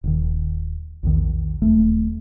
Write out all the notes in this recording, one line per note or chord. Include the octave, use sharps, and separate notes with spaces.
D#1 D#3
A#1 E2 D#3
D#1 A3